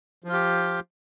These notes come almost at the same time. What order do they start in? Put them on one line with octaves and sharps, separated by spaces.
F3 F4 G4